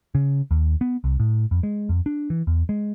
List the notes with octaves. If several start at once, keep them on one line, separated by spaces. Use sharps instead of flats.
C#3
D#2
B3
C2
A2
F2
G#3
F2
D4
E3
E2
G#3